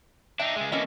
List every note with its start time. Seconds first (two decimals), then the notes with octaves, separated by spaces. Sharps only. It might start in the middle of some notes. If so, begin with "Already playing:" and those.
0.40 D4 D#4 E5 G5
0.56 C#3 G#3
0.72 E3 A3 A#3 C#4 E4 D#5